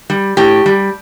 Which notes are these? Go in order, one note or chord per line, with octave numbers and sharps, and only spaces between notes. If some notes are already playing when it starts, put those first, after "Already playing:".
G3
A2 G4
G3